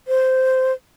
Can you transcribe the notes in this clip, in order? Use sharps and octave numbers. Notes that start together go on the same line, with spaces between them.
C5